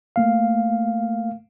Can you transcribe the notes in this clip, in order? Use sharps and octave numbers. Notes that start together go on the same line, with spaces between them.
A3 A#3 F5